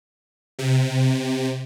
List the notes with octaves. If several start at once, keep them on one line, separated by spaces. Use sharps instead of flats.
C3